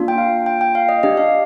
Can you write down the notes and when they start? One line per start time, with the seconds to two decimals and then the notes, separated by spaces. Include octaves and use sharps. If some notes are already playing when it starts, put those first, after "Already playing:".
Already playing: A#3 D4 F4
0.08 G5
0.18 F5
0.46 G5
0.61 G5
0.75 F5
0.89 D#5
1.03 D4 G4 D#5
1.17 F5